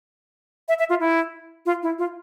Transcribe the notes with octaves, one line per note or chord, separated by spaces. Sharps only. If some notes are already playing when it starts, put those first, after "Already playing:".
E5
E5
F4
E4
F4
E4
F4